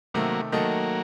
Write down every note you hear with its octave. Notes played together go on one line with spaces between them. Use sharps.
C3 D#3 F#3 A3 A#3
D#3 F#3 A3 A#3 D#4 A4